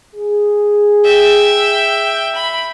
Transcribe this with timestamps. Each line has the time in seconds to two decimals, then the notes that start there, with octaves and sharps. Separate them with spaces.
0.16 G#4
1.04 E5 G5
2.35 B5